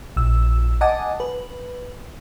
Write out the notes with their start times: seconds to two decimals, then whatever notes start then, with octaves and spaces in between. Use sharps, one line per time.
0.16 A#1 E6
0.81 D#5 F#5 G#5 A5 D6 D#6
1.20 B4